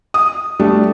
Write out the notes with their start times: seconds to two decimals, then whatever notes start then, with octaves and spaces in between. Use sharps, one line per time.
0.14 D#6
0.59 G3 A3 D4